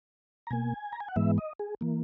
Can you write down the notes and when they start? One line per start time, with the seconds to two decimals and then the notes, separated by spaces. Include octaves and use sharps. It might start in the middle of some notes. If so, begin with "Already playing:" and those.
0.47 A#5
0.51 B2 A#3 G#5
0.93 A#5
1.00 G#5
1.08 F#5
1.16 G#2 E3 G#3 B3 E5
1.38 D#5
1.59 G#4
1.81 E3 A#3